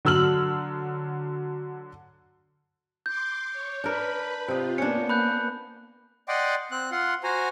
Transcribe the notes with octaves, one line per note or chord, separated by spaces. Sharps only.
D3 F#3 E6 F6 F#7
C6 D6 G6
C#5
D4 A#4 B4 B5
C3 F4 D#5
A#3 B3 C#4 D4 C#7
B5 F#6 G6
D5 D#5 F#5 G5 C6 D6
C4 F#6
F4 F#5 C6
F#4 C5 G#5 A#5